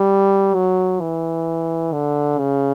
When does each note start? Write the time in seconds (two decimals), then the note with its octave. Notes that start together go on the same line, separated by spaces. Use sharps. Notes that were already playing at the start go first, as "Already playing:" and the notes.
Already playing: G3
0.55 F#3
1.01 E3
1.93 D3
2.39 C#3